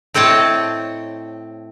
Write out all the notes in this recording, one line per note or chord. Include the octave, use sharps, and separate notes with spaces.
A2 C4 C#5 D#5 A5